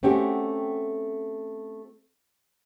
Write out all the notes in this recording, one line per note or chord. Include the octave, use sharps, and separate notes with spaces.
A3 C4 C#4 F#4 G4